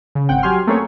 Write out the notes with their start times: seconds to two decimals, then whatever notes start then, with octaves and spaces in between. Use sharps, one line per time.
0.15 C#3
0.29 G#1 C4 F#5 G5
0.43 F#3 G4 G#5 C6 F6
0.67 A3 A#3 C4 C#4 G#4 C#5